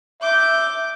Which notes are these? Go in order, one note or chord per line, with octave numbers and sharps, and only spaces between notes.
E5 D6 G6